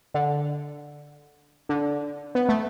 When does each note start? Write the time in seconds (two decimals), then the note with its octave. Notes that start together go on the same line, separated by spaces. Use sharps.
0.14 D3
1.69 D3
2.35 B3
2.49 A3